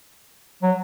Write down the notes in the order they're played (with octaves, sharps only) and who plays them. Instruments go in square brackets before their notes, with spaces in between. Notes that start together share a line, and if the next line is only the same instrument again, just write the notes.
[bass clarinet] F#3